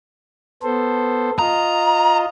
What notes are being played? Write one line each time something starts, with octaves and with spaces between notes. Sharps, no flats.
B3 A4 C5
F4 D#5 A#5